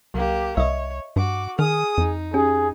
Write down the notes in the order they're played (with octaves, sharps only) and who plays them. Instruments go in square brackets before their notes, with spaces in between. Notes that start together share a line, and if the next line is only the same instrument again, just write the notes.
[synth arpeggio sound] C2 F#3 [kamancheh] A#3 G4
[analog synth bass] C2 [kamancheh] C#5 [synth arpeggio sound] D#5 E5
[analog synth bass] G2 [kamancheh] F#4 D6
[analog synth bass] D#3 [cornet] G#4 [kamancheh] D#6 [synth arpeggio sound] F6
[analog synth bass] F2 [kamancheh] D#4
[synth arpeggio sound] C#4 G4 [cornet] G#4